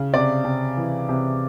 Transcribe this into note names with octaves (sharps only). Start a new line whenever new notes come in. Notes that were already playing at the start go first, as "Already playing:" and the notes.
Already playing: C#3
C3 D5
C3
E3
C3